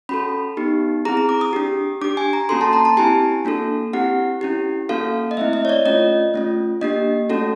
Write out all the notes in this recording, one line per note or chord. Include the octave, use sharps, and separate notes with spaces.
C#4 F#4 A4 B5
B3 D#4 G4
C4 E4 G#4 A#5
A#5
D6
D#6
D4 G4
D4 G4 D6
G#5
A#5
A#3 C#4 F#4 A4 C6
A5
A#5
A5
C4 E4 G4 G#5
A#3 D4 F#4 A4
C4 E4 G4 F#5
C#4 E4 G4
A#3 C#4 F#4 A4 F5
D#5
A3 C4 E4 E5
D#5
C#5
D5
A3 C#4 F4 D#5
A3 C#4 F4
A#3 D4 G4 D#5
A3 C#4 F#4 A4